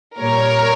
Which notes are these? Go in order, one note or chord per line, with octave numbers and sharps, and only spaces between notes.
A#2 G3 A#4 C#5